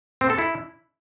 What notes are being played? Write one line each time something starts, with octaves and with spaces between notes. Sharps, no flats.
C4
A4
E4